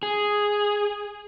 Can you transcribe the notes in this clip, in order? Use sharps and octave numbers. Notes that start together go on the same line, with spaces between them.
G#4